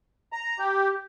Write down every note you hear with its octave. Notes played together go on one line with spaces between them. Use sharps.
A#5
G4